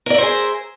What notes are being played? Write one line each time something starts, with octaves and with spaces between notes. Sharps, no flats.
G#4 A#4 C5 D5 E5